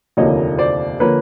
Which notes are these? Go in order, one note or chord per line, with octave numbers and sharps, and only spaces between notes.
F1 D#2 D3 F3 A#3 C#5 D#5
C5 D5
D3 F3 A#3 B4 C#5